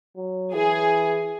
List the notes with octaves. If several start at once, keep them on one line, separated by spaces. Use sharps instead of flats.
F#3
E3 G#4